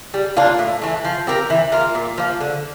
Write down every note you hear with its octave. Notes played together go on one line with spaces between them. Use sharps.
G3
A#3 D4 F4
A2
E3 A3
F3
C4 G4 A#4
E3
A#3 F4
A#2
F3 A#3
D3